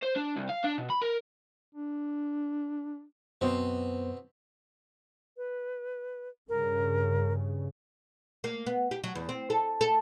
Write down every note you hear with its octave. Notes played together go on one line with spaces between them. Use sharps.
C5
D4
C2
F5
D4
B2
B5
A#4
D4
F#2 B2 B3 C4 C5
B4
G2 C#3 A#4
A#3
B3
G4
F#3
E2
C4
A4
A4